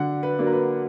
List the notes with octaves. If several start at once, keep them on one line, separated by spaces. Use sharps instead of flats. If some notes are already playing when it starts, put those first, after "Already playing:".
Already playing: D3 F#3 D4 F#5
B4
F#3 A#3 D4
A#4
B4